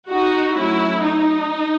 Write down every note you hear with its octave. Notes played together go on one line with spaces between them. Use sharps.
D#4 F#4
F#3 A3 C#4 E4
D#4